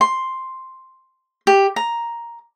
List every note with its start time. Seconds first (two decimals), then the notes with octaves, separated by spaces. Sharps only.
0.01 C6
1.47 G4
1.76 A#5